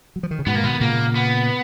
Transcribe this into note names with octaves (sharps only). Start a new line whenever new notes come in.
F#3
F3
D#3
C#3
G#2 B2 B3
A#3
B2 D#3 B3
A#2 C#3 A#3
B3